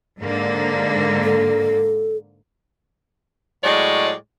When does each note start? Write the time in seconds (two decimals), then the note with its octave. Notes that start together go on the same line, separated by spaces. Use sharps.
0.20 G#2 D3 A#3
1.24 A4
3.64 A2 F#3 G#3 C#5 D5